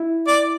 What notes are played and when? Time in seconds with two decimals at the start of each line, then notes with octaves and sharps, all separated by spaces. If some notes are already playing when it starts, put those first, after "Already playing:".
Already playing: E4
0.28 D5